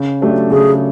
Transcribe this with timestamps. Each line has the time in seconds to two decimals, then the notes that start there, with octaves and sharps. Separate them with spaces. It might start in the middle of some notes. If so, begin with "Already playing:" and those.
Already playing: C#3
0.21 F#3 A3 D4 G4
0.50 C#3 G#4